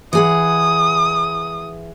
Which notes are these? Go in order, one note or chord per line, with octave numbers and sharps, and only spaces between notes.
E3 G#4 F#5 D#6